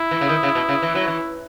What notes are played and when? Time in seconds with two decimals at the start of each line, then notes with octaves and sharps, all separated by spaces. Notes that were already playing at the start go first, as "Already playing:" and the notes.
Already playing: E4
0.11 E3
0.21 C#3
0.29 D#3
0.43 C#3
0.55 B2
0.69 C#3
0.82 E3
0.95 F#3
1.08 E3